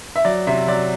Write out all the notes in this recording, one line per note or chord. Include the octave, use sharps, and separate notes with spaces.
E5
F#3 D5
C3 E5
F#3 D5